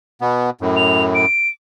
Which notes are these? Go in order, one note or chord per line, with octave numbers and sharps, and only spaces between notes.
B2 B3
F#2 A2
F7
D7